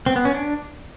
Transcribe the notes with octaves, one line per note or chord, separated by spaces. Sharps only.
C4
B3
C#4
D4